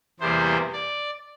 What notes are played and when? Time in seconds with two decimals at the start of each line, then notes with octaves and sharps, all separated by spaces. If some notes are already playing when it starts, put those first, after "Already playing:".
0.20 E2 C3 E3 G3 A#3 C5
0.73 D5